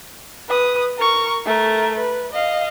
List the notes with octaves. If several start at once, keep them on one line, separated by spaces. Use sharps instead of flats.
B4 D#6
A#4 C#6
A3 A#4
B4
D#5 F5